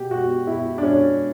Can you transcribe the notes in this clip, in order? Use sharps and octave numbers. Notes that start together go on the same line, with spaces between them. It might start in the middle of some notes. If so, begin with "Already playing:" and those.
Already playing: B2 G4
B2 F#4
B2 E4
D4
B2 C#4